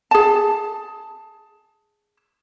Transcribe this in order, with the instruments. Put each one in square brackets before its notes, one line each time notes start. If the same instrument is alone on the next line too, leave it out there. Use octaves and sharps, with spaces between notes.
[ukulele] G#4 A5